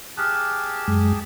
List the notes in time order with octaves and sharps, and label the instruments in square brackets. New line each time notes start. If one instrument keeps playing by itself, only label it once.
[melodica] G4 G#4 A5 [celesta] D6 F6 F#6
[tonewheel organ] F#2 G#3